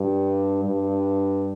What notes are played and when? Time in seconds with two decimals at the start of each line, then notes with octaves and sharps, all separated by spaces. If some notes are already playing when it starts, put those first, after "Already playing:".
Already playing: G2
0.65 G2